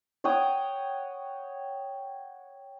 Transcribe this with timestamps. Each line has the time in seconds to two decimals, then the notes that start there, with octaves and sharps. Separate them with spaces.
0.24 C#5 F#5 G5 D#6